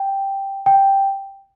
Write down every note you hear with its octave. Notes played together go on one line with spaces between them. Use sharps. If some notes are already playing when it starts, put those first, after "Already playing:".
Already playing: G5
G5